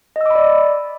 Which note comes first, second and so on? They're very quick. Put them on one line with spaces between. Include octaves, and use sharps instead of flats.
D#5 E6 D6 B5 D5